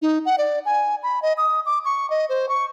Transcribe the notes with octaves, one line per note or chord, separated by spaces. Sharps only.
D#4
F#5
D5
G#5
B5
D#5
D#6
D6
C#6
D#5
C5
C#6